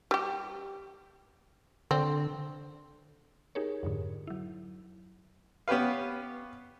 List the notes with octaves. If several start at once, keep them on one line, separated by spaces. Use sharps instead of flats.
G3 G4
D3 C4
D#4 G4 G#4 A#4 C#5
F2 G#2 D3
F#3 E4
B3 C#4 G4 B4 F5